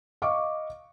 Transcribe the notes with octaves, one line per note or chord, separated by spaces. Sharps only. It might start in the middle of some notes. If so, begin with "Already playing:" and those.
D#5 F5 C#6 D6